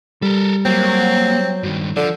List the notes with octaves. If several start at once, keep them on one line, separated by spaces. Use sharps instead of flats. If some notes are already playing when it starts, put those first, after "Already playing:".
G3 A4 A#4
F#3 A#3 C4
G2 D#3
D3 F3